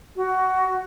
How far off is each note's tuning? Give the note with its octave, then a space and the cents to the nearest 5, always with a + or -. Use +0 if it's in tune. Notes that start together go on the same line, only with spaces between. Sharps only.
F#4 +15